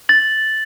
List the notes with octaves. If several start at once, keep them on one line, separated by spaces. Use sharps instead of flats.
A6 F#7